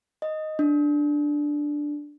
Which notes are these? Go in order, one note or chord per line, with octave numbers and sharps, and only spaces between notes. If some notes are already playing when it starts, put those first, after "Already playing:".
D#5
D4